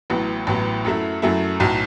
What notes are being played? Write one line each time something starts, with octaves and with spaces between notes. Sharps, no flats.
A1 A2 F#3 B3
A1 A2 F#3 B3
F#2 F#3 A3 E4
F#2 F#3 A3 E4
B1 A2 F#3